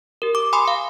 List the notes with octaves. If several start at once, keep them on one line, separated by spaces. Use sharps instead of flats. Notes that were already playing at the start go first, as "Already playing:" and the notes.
G4 A#4
D6
G#5 B5 C6 D#6 C7
F5 G#5